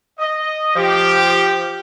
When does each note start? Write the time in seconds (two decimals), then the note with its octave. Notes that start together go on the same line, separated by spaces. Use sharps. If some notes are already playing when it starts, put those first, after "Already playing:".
0.19 D#5
0.75 F3 G4